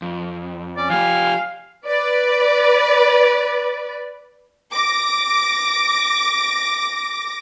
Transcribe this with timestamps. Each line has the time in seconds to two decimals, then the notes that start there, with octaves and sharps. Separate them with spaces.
0.02 F2
0.77 C#4 D5
0.90 F3 G4 F5 G#5
1.87 B4 D5
4.73 D6 A#6